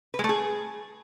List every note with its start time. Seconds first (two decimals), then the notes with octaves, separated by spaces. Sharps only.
0.14 B4
0.19 G#3
0.24 A3
0.29 G#4